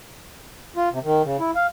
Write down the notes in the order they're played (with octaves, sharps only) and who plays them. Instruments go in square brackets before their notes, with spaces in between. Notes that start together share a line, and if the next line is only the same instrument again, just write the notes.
[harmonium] F4
C3
D#3
C#3
E4
F5